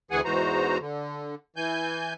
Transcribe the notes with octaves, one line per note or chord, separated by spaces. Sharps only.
D2 E3 G#4 F#5 G#5
E2 G#2 E3 F#4 C5 A#5
D3
E3 G#5 G6